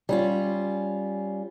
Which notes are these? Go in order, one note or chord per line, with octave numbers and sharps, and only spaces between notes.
G3 C#4 F4